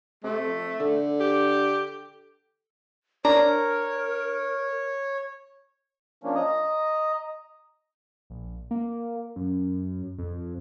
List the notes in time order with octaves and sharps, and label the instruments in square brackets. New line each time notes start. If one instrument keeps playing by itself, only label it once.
[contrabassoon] C3 [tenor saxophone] A3
[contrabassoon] F2
[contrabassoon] D3 [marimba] A4
[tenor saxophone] G4
[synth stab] D4 [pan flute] A#4 [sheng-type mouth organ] C#5 [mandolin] A#5
[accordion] F3 A#3 C#4 D4
D#5 A#5 D#6
[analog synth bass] A#1
A#3
F#2
F2